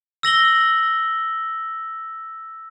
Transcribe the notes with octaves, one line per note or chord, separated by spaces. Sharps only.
E6 A#6 F#7 G7